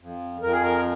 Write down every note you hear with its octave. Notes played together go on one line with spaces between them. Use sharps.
F2
F2 A#4
G#4
A#4